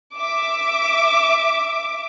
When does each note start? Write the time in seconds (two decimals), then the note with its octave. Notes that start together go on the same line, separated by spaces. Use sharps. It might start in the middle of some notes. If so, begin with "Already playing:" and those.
0.17 E5 D6